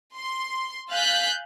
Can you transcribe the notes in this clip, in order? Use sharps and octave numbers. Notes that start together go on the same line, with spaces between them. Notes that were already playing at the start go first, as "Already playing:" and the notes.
C6
F5 G#5 F#6 G6 A6 B6